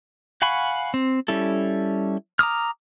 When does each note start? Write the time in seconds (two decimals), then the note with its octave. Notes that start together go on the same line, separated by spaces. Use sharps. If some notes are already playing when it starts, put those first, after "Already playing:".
0.42 F5 F#5 G#5 B5 C#6
0.94 C4
1.28 G3 C#4 E4 A4
2.39 A#5 D6 D#6 F6